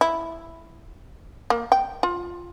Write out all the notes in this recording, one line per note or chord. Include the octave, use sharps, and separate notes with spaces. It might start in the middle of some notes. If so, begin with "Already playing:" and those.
E4
A#3
G5
F4